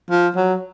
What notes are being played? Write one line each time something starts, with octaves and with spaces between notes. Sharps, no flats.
F3
F#3